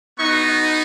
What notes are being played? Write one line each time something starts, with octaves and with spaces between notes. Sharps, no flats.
B3 D#4 F#4 C#6